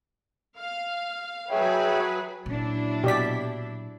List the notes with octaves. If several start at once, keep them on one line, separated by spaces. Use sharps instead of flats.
F5
F#3 G#4 B4 C#5 E5 G5
A#2 F#3 D4 E4
B2 G4 D5 B6